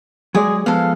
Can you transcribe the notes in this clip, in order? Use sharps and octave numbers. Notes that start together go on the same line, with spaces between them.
F#3 G#3 G#4 D5
F3 G#3 B3 A4 F5